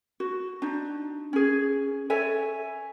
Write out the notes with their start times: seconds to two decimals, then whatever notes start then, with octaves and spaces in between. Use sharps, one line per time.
0.20 F#4
0.62 D4 D#4
1.33 C#4 G#4
2.10 A4 C#5 E5 G#5